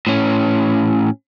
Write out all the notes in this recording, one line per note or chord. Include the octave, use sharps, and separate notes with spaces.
A2 C#4